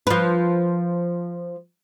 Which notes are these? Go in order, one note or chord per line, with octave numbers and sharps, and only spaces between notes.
F3 B4